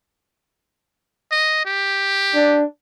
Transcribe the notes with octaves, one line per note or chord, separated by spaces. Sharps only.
D#5
G4
D4